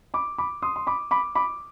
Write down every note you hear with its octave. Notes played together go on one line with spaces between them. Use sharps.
B5 D6
B5 D6
C6 D#6
C6
B5 D6
B5 D6
B5 D6